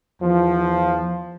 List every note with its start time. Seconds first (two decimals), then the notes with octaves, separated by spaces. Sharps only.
0.21 E2 F3